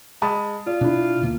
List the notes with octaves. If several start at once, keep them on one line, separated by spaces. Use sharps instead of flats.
G#3 A5 B5 D#6
F4 D5
B2 D4 E4
D2 B2 A#3